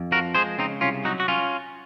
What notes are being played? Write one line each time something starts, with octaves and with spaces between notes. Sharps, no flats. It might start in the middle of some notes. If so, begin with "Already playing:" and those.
Already playing: F2
F3 F#4 A#4
G#3 G#4 C5
C#3 C4 D#4
C2 C#4 F4
F#3 D#4 F#4
F#4
C#4 F4